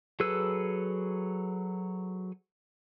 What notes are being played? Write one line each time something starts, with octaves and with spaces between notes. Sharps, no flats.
F#3 G#4 A4 B4 E6